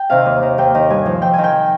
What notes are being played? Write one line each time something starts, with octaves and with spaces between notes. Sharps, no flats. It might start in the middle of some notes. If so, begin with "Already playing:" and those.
Already playing: G5
C3 D#3 F5
D#2
D#3
D#2 G5
D#3
G2 G#5
F3
F2 G5
D#3 G#5
G5